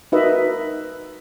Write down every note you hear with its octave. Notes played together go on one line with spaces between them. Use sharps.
D#4 F#4 A#4 B4 D#5 E5